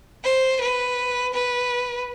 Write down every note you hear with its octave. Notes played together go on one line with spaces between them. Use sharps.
C5
B4
B4